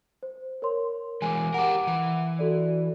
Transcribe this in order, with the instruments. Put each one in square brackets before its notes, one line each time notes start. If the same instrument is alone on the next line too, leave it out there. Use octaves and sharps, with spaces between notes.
[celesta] C5
A#4 C#5 C6
[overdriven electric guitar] E3 G#3 [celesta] G#5 D6
[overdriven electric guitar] G4 A#4 [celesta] F#5 D6
[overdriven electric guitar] E3
[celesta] F#4 A4 D5